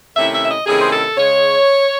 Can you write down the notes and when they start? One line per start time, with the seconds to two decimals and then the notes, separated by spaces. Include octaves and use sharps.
0.15 C3 D#3 A3 C#4 E4 E5
0.32 E5
0.44 E5
0.49 D#5
0.66 C3 D#3 A3 C#4 E4 G#4
0.81 C5
0.91 A4
1.16 C#3 G#3 C#5